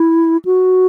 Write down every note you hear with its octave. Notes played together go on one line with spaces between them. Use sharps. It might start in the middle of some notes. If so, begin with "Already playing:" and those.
Already playing: E4
F#4